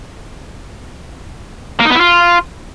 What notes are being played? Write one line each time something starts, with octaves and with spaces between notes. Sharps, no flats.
A#3
D#4
B3
E4
F4